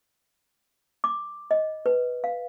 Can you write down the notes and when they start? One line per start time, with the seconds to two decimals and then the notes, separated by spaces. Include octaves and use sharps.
1.04 D6
1.51 D#5
1.86 B4
2.24 F5